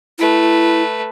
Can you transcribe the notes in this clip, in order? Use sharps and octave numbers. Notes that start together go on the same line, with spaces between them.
A3 E4 B4